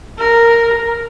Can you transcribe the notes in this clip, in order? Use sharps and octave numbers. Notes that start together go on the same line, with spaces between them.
A#4